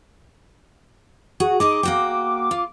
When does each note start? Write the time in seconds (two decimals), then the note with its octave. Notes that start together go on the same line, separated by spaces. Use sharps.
1.40 F#4 G#4
1.60 D#4 G#4 D#5 D6
1.83 A#3 F#4 G5
2.51 F4